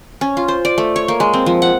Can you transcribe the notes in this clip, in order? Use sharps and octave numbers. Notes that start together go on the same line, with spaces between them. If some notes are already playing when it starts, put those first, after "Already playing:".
C#4
F4
C5
D5
A3
C#5
A#3
G#3
C4
F3
F#5